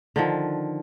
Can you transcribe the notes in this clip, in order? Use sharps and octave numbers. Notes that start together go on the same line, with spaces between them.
D3 D#3 F3